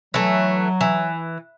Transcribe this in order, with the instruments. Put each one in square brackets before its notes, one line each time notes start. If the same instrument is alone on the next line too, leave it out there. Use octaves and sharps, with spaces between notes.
[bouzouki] E3 A3 [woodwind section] F#3
[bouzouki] E3